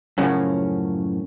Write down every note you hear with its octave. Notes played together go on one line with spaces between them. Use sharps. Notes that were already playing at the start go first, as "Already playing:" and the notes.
F#2 A2 C#3 F3 A#3 C#4